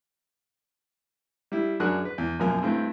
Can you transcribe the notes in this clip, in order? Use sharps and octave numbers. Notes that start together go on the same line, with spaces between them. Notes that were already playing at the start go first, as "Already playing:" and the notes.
G3 E4
F#2 D4 F#4 G#4 A#4 F#6
B4
E2
F#2 B2 F3 A#3 A#4 G#5
G2 A3 C4 E4